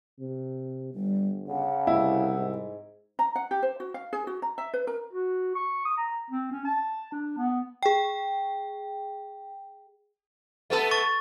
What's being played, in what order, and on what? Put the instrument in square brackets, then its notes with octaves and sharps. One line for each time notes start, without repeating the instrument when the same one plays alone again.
[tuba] C3
[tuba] G1 [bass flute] G3
[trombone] C#3 [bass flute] F#5
[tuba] C2 [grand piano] E4
[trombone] G#2
[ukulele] A#5
F#5
G4
C5
F#4
F5
G#4
F#4
A#5
E5
B4
A#4
[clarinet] F#4
C#6
D#6
A#5
C4
C#4
A5
D4
B3
[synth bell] G#4 G5
[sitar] A3 B3 A4
[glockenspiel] C#6 A6